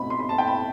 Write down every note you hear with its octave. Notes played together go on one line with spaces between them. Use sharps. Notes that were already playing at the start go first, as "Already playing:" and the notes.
Already playing: B2 A3 C4 B5
C6
B5
A5
G5
B5